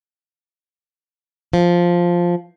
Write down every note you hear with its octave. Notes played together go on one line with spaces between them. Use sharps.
F3